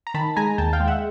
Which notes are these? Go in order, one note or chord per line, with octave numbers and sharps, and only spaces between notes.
A#5
D#3 A5 B5
G#3 G#5 A#5
D#2 G5 A5
F5 G5
G#3
E5 F#5